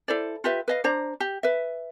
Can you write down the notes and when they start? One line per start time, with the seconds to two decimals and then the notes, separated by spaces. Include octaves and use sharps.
0.08 E4 A4 C5 D5
0.44 F4 G4 B4 E5
0.68 B4 D#5 F5
0.84 D4 C5 D5 A#5
1.20 G4
1.43 B4 E5